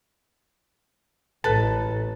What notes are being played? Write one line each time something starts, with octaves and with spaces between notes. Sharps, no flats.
A1 A4 B4 A5